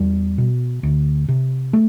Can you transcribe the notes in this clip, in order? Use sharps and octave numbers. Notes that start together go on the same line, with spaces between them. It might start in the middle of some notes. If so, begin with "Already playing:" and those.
Already playing: E2 G3
B2
D2
C3
A3